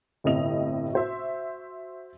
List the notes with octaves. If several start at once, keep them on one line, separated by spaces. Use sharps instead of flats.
G1 A2 C3 D#5 F7
F#4 C5 E5